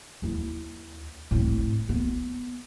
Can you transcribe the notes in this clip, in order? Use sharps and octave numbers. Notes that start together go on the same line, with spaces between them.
D#2 E4
A2 C4
B3